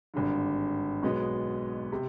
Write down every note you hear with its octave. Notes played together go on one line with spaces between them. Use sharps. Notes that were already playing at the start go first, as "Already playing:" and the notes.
G#1 G2 D3
B1 B2 G#3 B3
C3